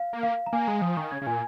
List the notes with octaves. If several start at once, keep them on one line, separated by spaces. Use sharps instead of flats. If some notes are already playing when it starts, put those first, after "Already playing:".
Already playing: F5
A#3
F5
A#5
A#3 G#5
G#3 A#5
F3 D#6
D#3 C#6
C#3 G#6
C#3
A#2 G#5